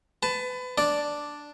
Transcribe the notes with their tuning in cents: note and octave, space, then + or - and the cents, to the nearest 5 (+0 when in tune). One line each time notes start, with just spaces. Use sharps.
B4 +30 A5 +0
D4 +0 D5 +0